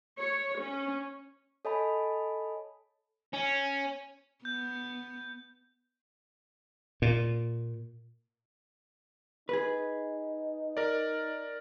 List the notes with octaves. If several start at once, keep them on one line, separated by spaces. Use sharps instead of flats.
C#5
C#4
A4 C#5 D#5 G#5 A5 B5
C#4
B3 G6
A#2
D#4 G#4 B4
A#4 D5